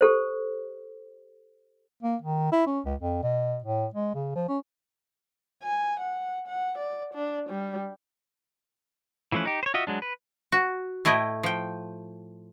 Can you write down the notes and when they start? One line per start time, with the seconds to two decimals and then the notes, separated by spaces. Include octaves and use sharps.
0.01 G4 A4 C5
2.03 A#3
2.22 D#3
2.52 E4
2.67 C#4
2.86 C#2
3.00 F2
3.23 B2
3.64 A2
3.94 G#3
4.15 C#3
4.35 F3
4.49 C#4
5.63 G#5
6.00 F#5
6.47 F#5
6.78 D5
7.14 D4
7.50 G3
9.32 E3 F3 A3 C#4 B4
9.46 D#4 G4
9.63 C5 C#5
9.74 F4 F#4 D#5 E5
9.87 F#3 G#3 D4
10.02 B4
10.52 F#4
11.05 A2 A3 E4 D#5 G5
11.43 F3 G5